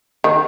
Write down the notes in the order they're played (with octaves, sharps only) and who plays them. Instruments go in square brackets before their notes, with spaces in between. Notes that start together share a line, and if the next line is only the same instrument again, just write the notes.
[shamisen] D#3